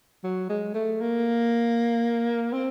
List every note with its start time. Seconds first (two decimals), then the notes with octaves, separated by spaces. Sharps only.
0.24 F#3
0.49 G#3
0.74 A3
1.01 A#3
2.53 C4